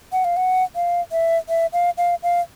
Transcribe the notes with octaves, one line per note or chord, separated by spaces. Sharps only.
F#5
F5
F#5
F5
E5
E5
F5
F5
F5